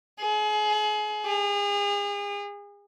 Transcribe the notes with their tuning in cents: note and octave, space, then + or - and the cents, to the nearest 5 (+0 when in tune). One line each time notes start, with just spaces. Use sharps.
G#4 +30
G#4 -40